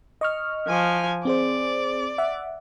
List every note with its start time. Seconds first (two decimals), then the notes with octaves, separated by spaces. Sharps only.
0.21 D#5 C#6 F6
0.68 F3 G#5
1.25 C4 G#4 C5 D5
2.18 E5 F#5